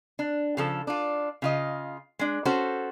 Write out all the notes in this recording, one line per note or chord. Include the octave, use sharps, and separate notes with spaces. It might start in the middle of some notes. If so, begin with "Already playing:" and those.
D4
C#3 F3 A4
D4 F4
C#3 F4 D#5
G#3 D4
C#4 F#4 A4 C5